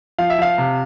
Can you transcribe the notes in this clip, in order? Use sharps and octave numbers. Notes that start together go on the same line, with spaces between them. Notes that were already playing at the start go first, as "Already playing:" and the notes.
F3 F5
E5
F3 F5
C3